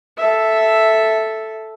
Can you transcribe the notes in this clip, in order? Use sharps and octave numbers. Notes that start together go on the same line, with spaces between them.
A4 E5